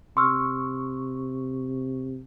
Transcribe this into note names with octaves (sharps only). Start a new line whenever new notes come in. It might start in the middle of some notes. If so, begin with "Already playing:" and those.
C3 C6 C#6 E6 F6